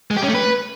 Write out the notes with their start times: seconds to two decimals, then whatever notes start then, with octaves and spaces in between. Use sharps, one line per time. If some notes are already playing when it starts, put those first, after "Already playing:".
0.11 G#3
0.17 G4
0.23 C#4
0.28 A3
0.34 B4